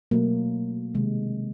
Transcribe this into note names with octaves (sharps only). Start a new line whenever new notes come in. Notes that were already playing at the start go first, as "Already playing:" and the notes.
B2 F#3 A3 A#3
C3 D#3 G#3